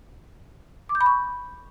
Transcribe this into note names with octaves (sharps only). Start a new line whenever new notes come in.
D6
G6
B5
C#6